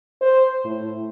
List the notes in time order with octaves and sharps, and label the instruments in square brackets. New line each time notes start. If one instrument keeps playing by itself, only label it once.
[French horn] C5
A2